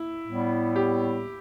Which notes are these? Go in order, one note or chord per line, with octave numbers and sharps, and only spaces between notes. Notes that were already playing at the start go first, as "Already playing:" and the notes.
Already playing: E4
A2 G3 B3
G4